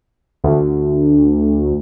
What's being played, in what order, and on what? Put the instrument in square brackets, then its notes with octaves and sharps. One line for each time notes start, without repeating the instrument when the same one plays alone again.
[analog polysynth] D2